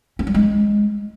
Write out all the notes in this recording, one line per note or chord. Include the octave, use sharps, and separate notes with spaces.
C#4
G3
G#3